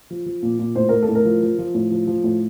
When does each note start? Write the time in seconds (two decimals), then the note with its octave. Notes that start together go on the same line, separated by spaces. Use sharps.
0.10 F3
0.26 F3
0.43 A#2
0.59 A#2
0.75 A2 C5
0.89 A2 A#4
1.03 A4
1.09 A2
1.15 A#4
1.25 F3
1.42 F3
1.59 F3
1.75 A2
1.91 F3
2.07 F3
2.24 A2